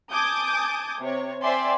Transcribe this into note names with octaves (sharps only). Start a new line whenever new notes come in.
G#5 A5 D6 D#6 G6
C3 C#5
C5 D5 E5 G5 G#5 C6